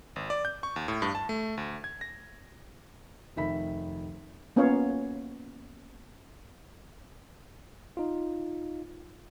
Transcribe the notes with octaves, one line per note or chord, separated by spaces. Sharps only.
G#1
D5
G6
C#6
D#2
A2
G2
A5
A3
D2
G#6
A#6
F1 D#3 E5 B5 B6
A#3 B3 C#4 F4 C#5 F5
D#4 F4